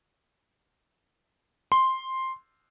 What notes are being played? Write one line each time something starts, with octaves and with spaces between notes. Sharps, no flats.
C6